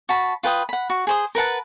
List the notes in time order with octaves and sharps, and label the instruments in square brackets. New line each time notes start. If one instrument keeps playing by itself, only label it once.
[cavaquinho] F#4 A5 B5
F4 B4 G5 D#6
F#5 B5
F#4
G#4 C5 D#6
A#4 B4 F#5 A5